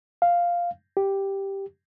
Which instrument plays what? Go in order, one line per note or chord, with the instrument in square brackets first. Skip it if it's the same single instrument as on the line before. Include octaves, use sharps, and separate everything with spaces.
[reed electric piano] F5
G4